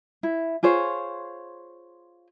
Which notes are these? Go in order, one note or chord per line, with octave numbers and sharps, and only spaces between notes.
E4
F4 G#4 C5 C#5